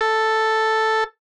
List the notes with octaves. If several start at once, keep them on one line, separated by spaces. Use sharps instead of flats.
A4